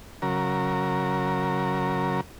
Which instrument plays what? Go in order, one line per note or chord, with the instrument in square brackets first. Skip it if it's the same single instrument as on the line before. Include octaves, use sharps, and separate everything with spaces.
[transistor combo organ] C#3 F#3 A#4